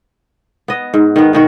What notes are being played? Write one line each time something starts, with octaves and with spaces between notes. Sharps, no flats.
B3 D#5
G#2
D#3 B3
B2 D#3 F#4